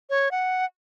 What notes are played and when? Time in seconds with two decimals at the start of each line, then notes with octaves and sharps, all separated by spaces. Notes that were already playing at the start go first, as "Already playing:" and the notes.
0.10 C#5
0.31 F#5